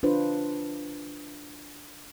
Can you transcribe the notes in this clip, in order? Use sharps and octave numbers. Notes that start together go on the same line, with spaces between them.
D4 F4 B4 C5